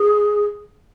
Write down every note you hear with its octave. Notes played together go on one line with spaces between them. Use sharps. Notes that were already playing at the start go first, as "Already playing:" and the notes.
Already playing: G#4